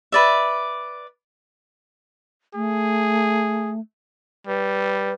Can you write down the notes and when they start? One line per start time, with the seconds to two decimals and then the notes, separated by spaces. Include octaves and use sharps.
0.12 B4 D5 E5
2.55 A3 G#4
4.47 G3 B4